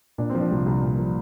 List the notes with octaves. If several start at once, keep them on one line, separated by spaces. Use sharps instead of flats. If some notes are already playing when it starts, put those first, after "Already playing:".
A#2 D4
C4
F3
D4
C2
C2
A#2
F3